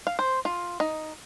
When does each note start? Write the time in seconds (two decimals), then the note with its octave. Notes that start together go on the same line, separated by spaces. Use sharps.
0.07 F5
0.19 C5
0.45 F4
0.80 D#4